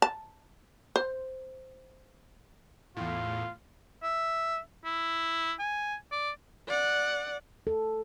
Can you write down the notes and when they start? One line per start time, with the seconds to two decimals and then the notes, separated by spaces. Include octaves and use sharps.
0.02 A5
0.96 C5
2.97 E2 A2 F4
4.03 E5
4.85 E4
5.59 G#5
6.12 D5
6.67 D5 F#5
7.67 A4